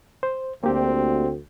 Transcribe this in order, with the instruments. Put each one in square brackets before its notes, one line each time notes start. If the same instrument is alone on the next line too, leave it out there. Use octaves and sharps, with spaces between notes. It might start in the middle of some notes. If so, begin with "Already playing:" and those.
[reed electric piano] C5
[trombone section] D2 [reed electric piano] A#3 G4 [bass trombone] C4